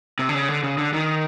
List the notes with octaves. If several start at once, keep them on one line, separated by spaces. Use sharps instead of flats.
C3
D3
C#3
D3
C#3
D3
D#3